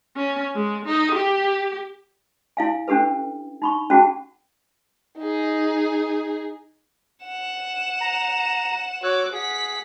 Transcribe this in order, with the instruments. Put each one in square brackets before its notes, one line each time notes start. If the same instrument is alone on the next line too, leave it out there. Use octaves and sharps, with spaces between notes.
[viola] C#4
G#3
D#4
G4
[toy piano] E4 F5 G#5
C#4 D4 G4 A4 B4
D#4 B5 C#6
C#4 F#4 G#4 F#5 A5
[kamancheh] D#4 G#4
[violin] F#5 E7
[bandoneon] A#5
[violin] F#4 D6 [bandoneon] C#5 E6 F#6
[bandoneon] G#4 [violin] F#5 B6